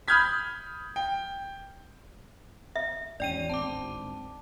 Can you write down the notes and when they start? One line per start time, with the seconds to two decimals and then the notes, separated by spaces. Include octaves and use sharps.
0.08 B5 D#6 F6 G6 G#6 B6
0.96 G5
2.76 E5
3.20 G#1 E2 C#4 D5 G5 D#7
3.50 D1 G#1 C4 A5 D6